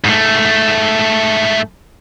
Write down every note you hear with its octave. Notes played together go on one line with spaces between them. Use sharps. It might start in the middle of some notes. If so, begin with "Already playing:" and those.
G#2 A3